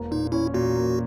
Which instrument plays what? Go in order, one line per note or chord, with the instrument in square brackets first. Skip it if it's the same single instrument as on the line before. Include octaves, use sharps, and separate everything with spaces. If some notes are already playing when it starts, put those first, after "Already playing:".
Already playing: [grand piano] E1 A#3
[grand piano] A#2 [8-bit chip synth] D#4
[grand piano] C#4 [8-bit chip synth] E4
[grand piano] A#2 [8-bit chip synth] F#4
[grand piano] A#3